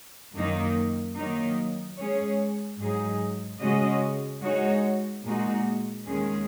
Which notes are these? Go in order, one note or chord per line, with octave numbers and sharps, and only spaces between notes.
F#2 D#3 A#3 D#4
D#3 F#3 A#3 D#4
G#3 C#4 G#4 C#5
G#2 F#3 D#4 G#4
C#3 G#3 C#4 F#4 D#5
G#3 D#4 F#4 C#5
A#2 G#3 D#4 F#4
D#2 D#3 G#3 C#4 G#4